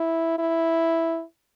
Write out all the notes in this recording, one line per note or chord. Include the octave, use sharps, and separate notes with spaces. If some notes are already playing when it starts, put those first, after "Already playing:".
Already playing: E4
E4